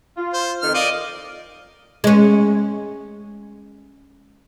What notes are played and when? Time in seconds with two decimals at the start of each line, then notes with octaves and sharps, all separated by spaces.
0.17 F4
0.34 C5
0.62 F2 D#3 F6
0.74 A#4 D5 D#5 F5
2.04 G#3 C#4